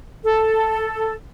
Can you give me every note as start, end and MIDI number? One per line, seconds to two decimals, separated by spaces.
0.24 1.14 69